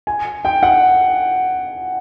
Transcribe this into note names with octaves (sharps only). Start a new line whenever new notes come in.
G#5
G5
F#5